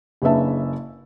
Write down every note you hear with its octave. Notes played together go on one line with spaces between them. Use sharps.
F#1 C#3 D4 B4 E5 A5